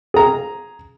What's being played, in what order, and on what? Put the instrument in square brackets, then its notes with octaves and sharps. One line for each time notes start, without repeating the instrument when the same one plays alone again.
[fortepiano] G#4 A#5